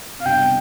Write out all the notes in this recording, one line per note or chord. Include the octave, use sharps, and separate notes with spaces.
C3 F5
G2 B2 G5
C3